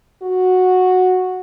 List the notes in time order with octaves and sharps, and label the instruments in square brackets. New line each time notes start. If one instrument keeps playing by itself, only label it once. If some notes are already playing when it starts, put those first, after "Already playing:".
[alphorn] F#4